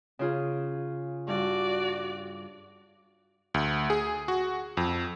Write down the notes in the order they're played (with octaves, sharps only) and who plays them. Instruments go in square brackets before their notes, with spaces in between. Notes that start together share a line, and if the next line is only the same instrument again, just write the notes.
[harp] C#3 F4 G#4
[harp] G2 [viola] F#4 D5
[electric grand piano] D2
G#4
F#4
F2